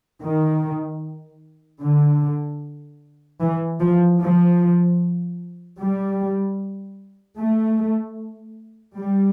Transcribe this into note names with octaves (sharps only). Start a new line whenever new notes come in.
D#3
D3
E3
F3
F3
G3
A3
G3